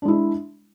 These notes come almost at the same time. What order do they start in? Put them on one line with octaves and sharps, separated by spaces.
D4 G#3 E4